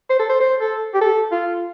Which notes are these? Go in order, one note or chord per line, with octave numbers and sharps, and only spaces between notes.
C5
A4
C5
C5
A4
G4
A4
F4